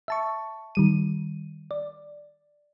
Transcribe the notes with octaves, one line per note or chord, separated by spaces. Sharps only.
E5 A5 C#6
D#3 G3 D#7
D5